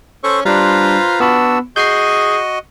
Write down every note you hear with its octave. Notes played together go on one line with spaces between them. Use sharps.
C#4 A4 C5 C#6
G3 D4 F4 B4 C5 A#5
B3 D4 F#4 B5 E6
F#4 G#4 D#5 G6 C7